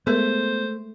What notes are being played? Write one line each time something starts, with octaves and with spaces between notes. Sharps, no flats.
G#3 A3 B3 G#4 A#4 C5